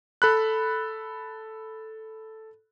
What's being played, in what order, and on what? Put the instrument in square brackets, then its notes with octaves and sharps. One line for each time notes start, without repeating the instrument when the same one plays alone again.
[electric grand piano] A4 B5 F#6